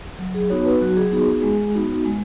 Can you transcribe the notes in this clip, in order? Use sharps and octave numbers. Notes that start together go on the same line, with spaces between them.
F#3
G#4
B3 D#4 F#4 C#5
B4
F#3 F#4
G#4
B3 D#4 F#4 G#4
G#4
G#3
B3 D#4 F#4
G#3